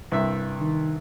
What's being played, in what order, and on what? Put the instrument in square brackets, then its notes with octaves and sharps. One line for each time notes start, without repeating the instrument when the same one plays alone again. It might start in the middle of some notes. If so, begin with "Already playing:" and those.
[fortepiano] C2 G2 E5
[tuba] D#3